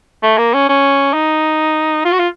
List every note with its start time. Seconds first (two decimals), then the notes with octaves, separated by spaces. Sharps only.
0.23 A3
0.38 A#3
0.54 C#4
0.69 C#4
1.13 D#4
2.05 F4
2.13 F#4
2.19 F4